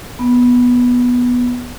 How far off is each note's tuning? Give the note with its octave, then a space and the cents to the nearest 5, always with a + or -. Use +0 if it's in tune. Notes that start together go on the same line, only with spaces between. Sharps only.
B3 -10